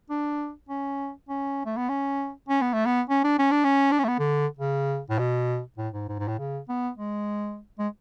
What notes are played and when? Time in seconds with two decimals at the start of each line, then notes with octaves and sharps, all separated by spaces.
0.10 D4
0.69 C#4
1.29 C#4
1.66 A3
1.77 B3
1.89 C#4
2.49 C#4
2.62 B3
2.73 A3
2.86 B3
3.09 C#4
3.24 D4
3.39 C#4
3.51 D4
3.64 C#4
3.92 D4
3.99 C#4
4.04 A3
4.08 B3
4.19 D3
4.58 C#3
5.10 A2
5.19 B2
5.78 A2
5.93 G#2
6.09 G#2
6.19 G#2
6.28 A2
6.39 C#3
6.69 B3
6.98 G#3
7.79 G#3